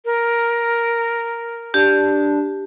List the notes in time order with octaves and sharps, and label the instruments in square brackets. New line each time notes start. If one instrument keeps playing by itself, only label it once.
[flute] A#4
[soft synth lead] D4 [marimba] G4